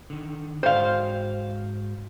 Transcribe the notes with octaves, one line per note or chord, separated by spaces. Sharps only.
D3 D#3
G#2 F#4 C5 F5 G5